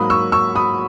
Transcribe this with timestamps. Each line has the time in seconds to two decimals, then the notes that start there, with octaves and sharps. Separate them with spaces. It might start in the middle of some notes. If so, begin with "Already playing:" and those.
Already playing: G#2 F#3 A#3 B5 D#6
0.10 C#6 E6
0.32 C#6 E6
0.55 B5 D#6